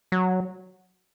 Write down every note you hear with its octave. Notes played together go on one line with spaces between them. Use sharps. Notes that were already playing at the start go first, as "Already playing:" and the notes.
F#3